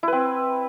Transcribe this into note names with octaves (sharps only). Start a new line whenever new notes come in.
C4 E4 B4